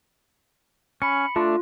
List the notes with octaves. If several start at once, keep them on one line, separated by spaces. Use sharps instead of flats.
C#4 B5 C#7
A3 D4 F4